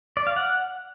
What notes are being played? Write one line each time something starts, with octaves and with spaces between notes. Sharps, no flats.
D5
F5
F#5